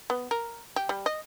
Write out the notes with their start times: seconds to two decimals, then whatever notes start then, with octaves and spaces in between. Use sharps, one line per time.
0.10 B3
0.31 A#4
0.76 G4
0.89 G3
1.06 D#5